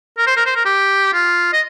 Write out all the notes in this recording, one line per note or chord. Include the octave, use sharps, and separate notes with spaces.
A#4
C5
A#4
C5
A#4
G4
F4
D#5